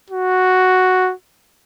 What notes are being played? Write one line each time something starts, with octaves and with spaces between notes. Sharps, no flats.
F#4